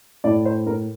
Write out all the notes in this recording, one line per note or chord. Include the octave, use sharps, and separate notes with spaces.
A2 D5
C5
A#4